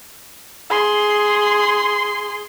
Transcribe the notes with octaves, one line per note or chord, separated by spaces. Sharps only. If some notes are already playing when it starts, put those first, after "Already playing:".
G#4 C6